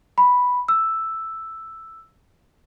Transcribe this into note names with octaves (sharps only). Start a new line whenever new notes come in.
B5
E6